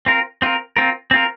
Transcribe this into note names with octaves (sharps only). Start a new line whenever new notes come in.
C4 F4 A#4
C4 F4 A#4
C4 F4 A#4
C4 F4 A#4